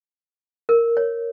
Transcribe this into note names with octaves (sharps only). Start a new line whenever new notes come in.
A#4
C#5